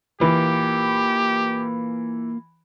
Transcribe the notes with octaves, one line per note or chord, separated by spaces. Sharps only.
E3 A#3 F4 G4